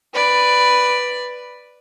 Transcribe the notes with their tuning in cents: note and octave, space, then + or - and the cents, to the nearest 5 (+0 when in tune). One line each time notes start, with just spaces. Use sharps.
B4 +0 D5 +5